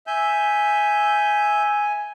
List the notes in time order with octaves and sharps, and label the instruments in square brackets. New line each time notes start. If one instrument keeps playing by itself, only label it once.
[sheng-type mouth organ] E5 G6 [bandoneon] G#5